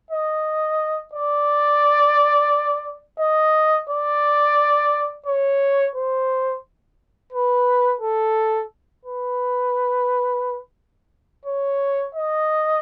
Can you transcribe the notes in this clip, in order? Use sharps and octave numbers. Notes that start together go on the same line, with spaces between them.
D#5
D5
D#5
D5
C#5
C5
B4
A4
B4
C#5
D#5